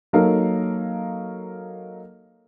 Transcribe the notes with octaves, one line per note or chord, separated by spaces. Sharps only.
F#3 A#3 D#4 A4 A#4 F5